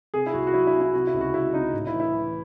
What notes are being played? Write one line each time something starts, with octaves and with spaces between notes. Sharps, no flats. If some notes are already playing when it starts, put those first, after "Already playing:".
C3 G#4
E4
C2 F#4
F#4
F#3 E4
E4
C3
E4
C3 F#4
E4
C#2
F#4
C#2 E4
C3 D#4
A2
E4
E3
E4
E3